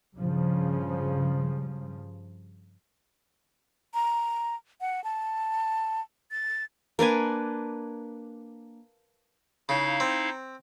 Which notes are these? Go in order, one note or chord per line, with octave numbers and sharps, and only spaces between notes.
G2 C#3 F3
A#5
F#5
A5
A6
A#3 D4 B4 G#5
C#3 D#4 E4 F5
C4